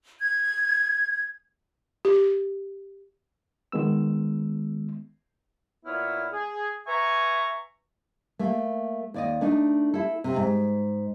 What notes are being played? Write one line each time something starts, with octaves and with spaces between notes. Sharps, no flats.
G#6
G4
D#3 G#3 B3 E6
A#2 B3 E4 C#5 F6
G#4
B4 E5 G#5 A#5 C#6
A3 A#3
D#2 D5 D#5
A3 D4 D#4
E4 A4
C3
G#2